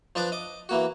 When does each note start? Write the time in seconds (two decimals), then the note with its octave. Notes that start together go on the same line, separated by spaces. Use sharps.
0.15 F3 D4 B4 D5 D6
0.32 D#5 D6
0.69 E3 A#3 F#4